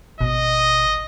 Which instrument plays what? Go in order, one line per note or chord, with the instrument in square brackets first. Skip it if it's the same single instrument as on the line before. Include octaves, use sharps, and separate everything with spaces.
[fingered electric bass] G#1 [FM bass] B2 [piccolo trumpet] D#5